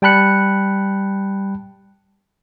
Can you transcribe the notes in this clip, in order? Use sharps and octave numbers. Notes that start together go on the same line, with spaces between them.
G3 G5 A5 B5 F#6 C#7